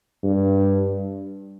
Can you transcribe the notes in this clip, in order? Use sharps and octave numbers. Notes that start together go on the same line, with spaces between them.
G2